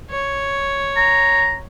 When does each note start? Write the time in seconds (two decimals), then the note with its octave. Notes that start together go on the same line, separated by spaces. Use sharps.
0.10 C#5
0.97 A#5